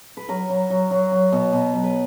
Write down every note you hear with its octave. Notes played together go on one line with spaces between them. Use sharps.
B4
F#3 A#4
F#3
F#3
F#3
F#3
B2
B2
F#3
B4